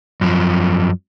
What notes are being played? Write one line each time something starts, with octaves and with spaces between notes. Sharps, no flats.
F#2 F3